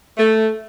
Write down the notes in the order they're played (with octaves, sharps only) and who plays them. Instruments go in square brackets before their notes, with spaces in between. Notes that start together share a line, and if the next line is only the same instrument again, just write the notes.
[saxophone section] A3